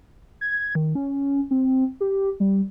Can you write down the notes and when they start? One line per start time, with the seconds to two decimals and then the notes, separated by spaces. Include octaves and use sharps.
0.41 G#6
0.75 D#3
0.95 C#4
1.51 C4
2.01 G4
2.40 G3